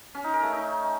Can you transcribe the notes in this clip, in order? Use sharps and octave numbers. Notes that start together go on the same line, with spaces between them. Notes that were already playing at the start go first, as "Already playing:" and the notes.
C#4
D#4
A#4
A3
D#4